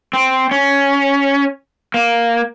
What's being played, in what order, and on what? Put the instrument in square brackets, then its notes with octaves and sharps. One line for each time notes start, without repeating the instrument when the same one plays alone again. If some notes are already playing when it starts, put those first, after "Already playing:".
[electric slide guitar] C4
C#4
A#3